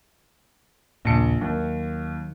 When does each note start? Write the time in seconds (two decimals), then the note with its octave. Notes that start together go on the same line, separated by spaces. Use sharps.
1.05 A#1 D#2 A#2 C#3 A5 C#7
1.41 D#2 D#3 F#3